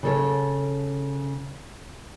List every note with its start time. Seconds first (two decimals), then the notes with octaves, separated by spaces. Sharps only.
0.03 C#3 A4 C#5